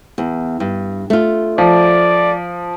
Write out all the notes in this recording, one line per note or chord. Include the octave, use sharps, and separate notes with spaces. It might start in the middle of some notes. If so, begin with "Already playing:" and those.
E2
G2
A3 F4
F3 D5